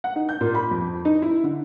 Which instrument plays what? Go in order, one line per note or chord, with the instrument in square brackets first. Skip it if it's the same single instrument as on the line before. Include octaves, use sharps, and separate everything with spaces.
[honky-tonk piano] F#5
D#4
G6
A#2
B5
F2
D#4
E4
D3